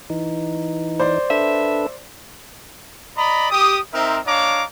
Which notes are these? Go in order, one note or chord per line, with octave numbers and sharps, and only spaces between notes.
E3 D#4
C5 D5
D4 A4 B4 E5
D5 D#5 A#5 B5
G4 D#6
C4 D#4 A#4 C5 E5
D4 C#5 D#5 F5 A#5 D6